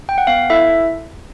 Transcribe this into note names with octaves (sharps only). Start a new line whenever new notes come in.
G5
F#5
B3 F5
E4 A4 E5